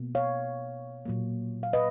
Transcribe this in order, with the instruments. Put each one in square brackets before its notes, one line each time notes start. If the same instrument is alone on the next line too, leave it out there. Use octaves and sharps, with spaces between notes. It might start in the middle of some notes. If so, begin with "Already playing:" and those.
Already playing: [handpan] B2 A#3
C#5 F5
A#2 F#3 A#3
F5
B4 D#5